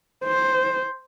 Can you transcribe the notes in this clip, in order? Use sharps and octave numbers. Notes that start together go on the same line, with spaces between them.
C5